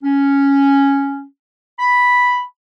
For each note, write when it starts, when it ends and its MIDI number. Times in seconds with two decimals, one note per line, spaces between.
0.03 1.23 61
1.79 2.41 83